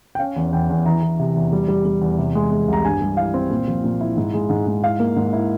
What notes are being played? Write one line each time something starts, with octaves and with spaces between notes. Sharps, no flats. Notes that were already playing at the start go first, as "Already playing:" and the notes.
G5
C#4 F5
E2
E2 G5
E2
E3 A#5
E3
C3
E2
G3
G3
G3
E2
C3
G#3
G#3
C2 A#5
G2 G#5
G3
E4 F5
C4
A#2
F3
A#2
E4
G#2
G#3
G#2
G#2
E4 F5
A#3
G#2
E4